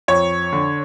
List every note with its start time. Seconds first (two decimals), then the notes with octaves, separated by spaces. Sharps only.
0.08 F2 C#5
0.53 D3